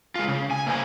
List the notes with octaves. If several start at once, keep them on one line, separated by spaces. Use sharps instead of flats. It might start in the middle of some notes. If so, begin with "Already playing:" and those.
G#3 F4
C#3
G#5
A#3 C#4 E4 A#4 C5 G#5